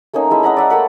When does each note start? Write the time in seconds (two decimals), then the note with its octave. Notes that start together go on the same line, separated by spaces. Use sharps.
0.13 A3 A#3 C#4 D#4
0.31 G#3 E4 E5
0.43 D#5 F#5 A#5 B5
0.57 D5 E5 F#5
0.70 A3 A#3 F#5 B5